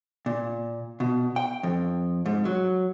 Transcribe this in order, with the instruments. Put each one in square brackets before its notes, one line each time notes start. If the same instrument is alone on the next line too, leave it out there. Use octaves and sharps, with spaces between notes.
[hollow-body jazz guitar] A#2
B2
G5
F2
G#2
F#3